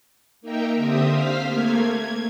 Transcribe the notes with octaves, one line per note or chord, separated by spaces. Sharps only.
A#3 D#4 A#4 E5 G5 A#5
D3 C4 G4 E5 D#6
C5 F5 F6 B6
A3 A#3 G#6
G#6